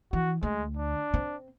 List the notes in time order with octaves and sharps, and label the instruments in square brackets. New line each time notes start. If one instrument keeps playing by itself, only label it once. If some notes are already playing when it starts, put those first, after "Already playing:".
[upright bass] E3 [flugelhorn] F#4
[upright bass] D2 [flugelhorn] G#3
[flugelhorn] D4
[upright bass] C4